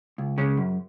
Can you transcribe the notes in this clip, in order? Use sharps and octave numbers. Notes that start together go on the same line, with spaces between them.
C#2
C#3 G#3 C#4
F#2